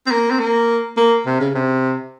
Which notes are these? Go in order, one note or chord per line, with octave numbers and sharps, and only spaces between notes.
C4
A#3
C4
A#3
A#3
C3
C#3
C3